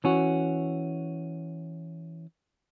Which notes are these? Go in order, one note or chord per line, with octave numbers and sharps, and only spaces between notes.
E3 C#4 F#4